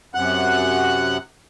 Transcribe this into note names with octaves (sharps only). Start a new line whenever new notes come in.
F#2 C3 F#5 F#6